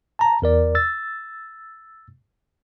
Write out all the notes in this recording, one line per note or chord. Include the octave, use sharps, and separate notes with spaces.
A5 A#5
E2 A#4 D5
E6 A6